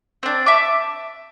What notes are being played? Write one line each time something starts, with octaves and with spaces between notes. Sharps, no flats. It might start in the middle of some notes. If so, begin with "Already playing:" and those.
C4 D4
E5 A5 D6